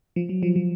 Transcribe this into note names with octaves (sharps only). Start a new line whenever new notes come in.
F3
F#3
F3
F3